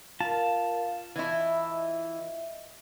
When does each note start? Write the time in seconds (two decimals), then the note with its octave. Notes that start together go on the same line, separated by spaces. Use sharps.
0.20 F4 A#4 F5 A5
1.16 E3 E4 D#5 E5